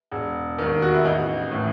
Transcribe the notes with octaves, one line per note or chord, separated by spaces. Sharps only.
E1
D#2 D#3
F#4
E4
A1 D#4
A2 E3